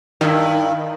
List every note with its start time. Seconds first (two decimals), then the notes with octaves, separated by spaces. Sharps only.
0.21 G2 D#3 E4